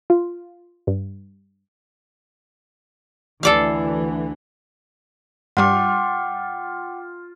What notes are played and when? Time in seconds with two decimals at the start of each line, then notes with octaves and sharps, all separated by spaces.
0.10 F4
0.87 G2
3.43 D2 D3 E3 A4 D5 F5
5.57 G2 G3 F4 F#5 G5 D6